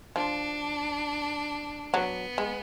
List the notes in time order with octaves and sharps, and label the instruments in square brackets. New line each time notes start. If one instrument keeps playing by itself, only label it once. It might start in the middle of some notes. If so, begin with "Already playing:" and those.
[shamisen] F3 [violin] D4
[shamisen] F#3 [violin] B3
[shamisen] G#3